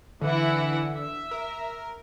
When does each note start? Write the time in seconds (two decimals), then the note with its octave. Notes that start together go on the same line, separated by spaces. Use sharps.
0.21 D3 E3 E4 F#5
0.94 E5
1.31 A#4